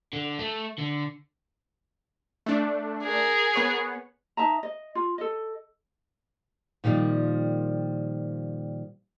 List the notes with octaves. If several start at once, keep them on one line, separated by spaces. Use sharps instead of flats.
D3
A3
D3
A3 D4
G#4 A#4
B3 C#5 F#5
D#4 E5 A5 A#5
D#5
F4
A4 D#5
A#2 D#3 F3 G3